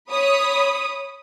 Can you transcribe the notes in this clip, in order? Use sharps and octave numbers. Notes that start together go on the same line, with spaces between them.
C#5 B5 D#6